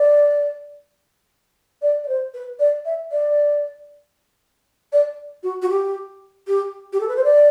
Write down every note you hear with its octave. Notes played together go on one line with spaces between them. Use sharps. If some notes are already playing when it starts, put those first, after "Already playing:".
Already playing: D5
D5
D5
C5
B4
D5
E5
D5
D5
F#4
F#4
G4
G4
G4
A4
B4
C5
D5